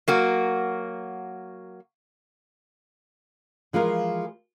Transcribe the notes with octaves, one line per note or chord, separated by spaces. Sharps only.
F#3 A#3 F#4
E3 F3 G#3 F4 A#4